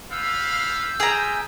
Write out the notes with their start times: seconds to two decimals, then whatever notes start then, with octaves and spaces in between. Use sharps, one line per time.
0.11 B3 F5 E6 G6
1.00 F4 G#4 E5 G5 A#5